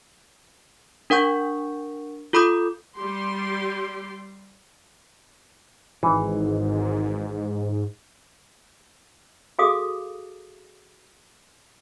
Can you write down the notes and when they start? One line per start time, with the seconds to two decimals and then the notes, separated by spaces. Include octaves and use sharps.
1.10 D4 A#4 F#5 C#6 G6
2.33 F4 A4 B5 D6 D#6 G6
2.96 G3 G4 C6
6.03 G#1 G#2 E3
9.59 F#4 G#4 A4 F5 D6 D#6